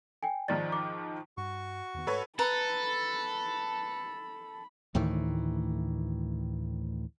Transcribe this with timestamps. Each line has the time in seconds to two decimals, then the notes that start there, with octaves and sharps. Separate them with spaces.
0.23 G5 G#5
0.48 G#2 D#3 F3 D5 A6
0.72 D6
1.37 G2 F#4 C#6
1.94 E2 D#3 B3
2.07 G#2 A4 B4 C#5
2.39 A4 B4 A#5 B5
4.95 D2 A2 D#3 E3